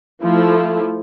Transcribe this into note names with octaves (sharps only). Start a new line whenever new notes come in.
F3 A3 E4